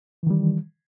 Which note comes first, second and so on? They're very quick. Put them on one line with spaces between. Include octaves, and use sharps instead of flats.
E3 D#3 G3